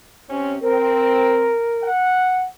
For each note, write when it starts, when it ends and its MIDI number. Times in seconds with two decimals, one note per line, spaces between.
0.29 0.56 48
0.29 0.56 60
0.29 0.56 61
0.62 1.55 60
0.62 1.88 70
1.83 2.46 78